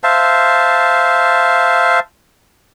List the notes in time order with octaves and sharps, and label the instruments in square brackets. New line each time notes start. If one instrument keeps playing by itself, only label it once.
[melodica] C5 E5 F5 A5